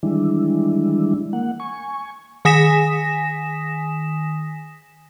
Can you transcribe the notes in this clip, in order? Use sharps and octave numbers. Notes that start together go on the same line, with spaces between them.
D#3 E3 G3 G#3 D4 E4
A#3 F#5
G#5 C#6
D#3 G#5 D#6 A#6 B6 E7